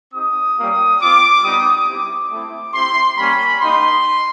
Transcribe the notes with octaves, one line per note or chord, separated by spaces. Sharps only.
C4 D#4 G4 D#6
G3 A#3 C#4 F4
C4 F4 D6
G3 B3 D#4 D#6
G3 C4 E4 G4 D6
A3 C4 E4
C4 E4 G4 C6
G3 A#3 C#4 B5
A#3 D#4 G4 C6